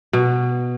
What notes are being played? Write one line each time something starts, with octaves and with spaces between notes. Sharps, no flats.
B2